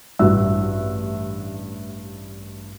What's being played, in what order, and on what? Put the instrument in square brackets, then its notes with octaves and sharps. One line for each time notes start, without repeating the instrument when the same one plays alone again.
[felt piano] A1 G2 F#4 E5 E6